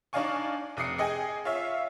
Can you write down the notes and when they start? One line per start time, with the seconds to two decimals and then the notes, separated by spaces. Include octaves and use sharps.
0.13 D4 D#4 D5 F5 G#5 C#6
0.77 F1 D6 D#6 C7 C#7
0.98 G#4 D#5 G5 G#5
1.45 F4 C#5 E5 F5